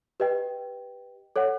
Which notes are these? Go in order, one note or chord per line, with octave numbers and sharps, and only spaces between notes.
G4 B4 D#5 G5
A4 C#5 F#5